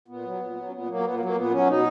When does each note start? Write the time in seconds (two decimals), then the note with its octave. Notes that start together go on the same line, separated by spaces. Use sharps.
0.08 A#2 B3
0.25 F#3
0.40 A#2
0.56 F#3
0.68 C#4
0.72 A#2 B3
0.88 F#3 A#3
1.04 A#2 B3
1.14 A#3
1.20 F#3
1.25 A#3
1.36 A#2 B3
1.51 F#3 C#4
1.67 B2 D#4